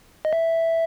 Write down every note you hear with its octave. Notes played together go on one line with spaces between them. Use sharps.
D#5
E5